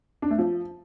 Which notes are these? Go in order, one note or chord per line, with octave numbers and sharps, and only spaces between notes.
D4
A3
F3